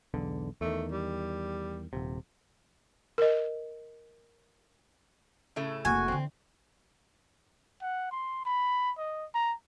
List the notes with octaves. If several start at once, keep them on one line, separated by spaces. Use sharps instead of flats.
B1 E2 D3
E2 D#3 A3
G3
D#1 C3
A#4 D#5
A2 C#3 A3
F1 A#3 F#4 G#5
D3 E3 C4
F#5
C6
B5
D#5
A#5